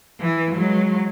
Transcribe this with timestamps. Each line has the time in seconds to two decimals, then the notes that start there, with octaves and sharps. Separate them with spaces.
0.20 E3
0.55 F#3 G#3